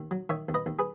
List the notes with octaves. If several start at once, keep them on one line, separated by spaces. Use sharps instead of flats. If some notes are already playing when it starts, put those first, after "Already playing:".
Already playing: D#2
F#3
D#3 C#5 E5
D#2
B4 D#5
D#2
G#4 B4